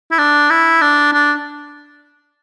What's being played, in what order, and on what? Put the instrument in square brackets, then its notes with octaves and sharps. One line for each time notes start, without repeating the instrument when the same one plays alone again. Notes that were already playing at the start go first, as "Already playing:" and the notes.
[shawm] E4
D4
E4
D4
D4